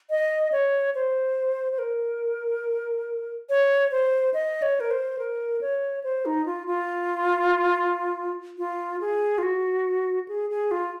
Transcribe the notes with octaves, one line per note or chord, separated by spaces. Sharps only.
D#5
C#5
C5
C5
A#4
C#5
C5
D#5
C#5
A#4
C5
A#4
C#5
C5
D#4
F4
F4
F4
G#4
F4
F#4
G#4
G#4
F4